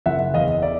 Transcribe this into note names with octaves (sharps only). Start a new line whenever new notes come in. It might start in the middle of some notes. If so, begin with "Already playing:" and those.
F#1 E5 F#5
E2 D#5 F5
D5 E5